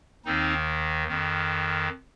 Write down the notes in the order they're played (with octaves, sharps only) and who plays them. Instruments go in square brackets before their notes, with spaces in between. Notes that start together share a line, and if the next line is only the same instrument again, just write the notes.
[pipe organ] D#2 D#3 C4 D#4
F2 D#3